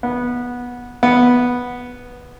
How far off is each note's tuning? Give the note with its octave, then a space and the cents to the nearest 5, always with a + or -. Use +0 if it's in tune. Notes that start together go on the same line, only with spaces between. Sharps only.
B3 -15
B3 -5